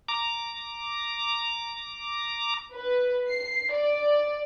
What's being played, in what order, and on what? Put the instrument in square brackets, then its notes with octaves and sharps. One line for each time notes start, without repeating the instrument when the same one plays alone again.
[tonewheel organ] A#5 D6
[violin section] B4
C7
D5